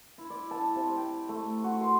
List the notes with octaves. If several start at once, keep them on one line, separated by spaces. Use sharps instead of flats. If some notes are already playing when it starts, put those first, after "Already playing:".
E4
D5
A5
C3
G5
A3
F#4
C6